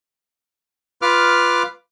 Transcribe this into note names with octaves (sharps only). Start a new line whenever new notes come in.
F4 B4 D6 F6